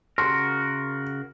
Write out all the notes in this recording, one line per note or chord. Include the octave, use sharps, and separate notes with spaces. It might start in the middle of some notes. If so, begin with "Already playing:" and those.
C#3 F#4 A#4 C6